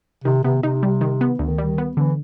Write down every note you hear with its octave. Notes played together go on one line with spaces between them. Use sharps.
C3 D#3
C3 B3
C3 D#4
G3
D#3
B3
D2 D#3
G3
B3
D3 E3